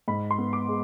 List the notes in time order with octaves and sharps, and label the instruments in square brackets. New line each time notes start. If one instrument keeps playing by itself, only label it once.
[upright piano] G#2 [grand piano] B5
[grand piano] C6
[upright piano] B3
[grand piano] D6
[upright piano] G#3